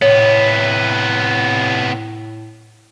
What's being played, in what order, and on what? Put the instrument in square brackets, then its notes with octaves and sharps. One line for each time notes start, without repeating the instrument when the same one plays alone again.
[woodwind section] A2 [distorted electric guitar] C3 B3 [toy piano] C#5